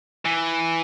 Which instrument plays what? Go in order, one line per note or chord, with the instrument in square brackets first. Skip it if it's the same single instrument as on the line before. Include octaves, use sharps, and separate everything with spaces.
[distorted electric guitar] E3